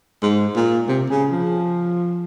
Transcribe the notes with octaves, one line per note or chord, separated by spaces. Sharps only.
G#2
A#2
C3
C#3
F3